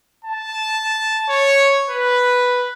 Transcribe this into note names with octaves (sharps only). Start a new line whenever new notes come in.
A5
C#5
B4